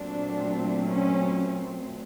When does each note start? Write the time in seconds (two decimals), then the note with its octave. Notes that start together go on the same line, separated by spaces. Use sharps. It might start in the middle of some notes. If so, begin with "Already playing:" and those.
Already playing: A#2 F#3 A3 C4 D4
0.88 C#4